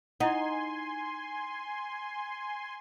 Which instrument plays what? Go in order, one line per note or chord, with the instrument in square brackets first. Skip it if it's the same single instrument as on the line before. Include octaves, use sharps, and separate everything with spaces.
[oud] D#4 [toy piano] E4 F#5 [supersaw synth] G#5 C6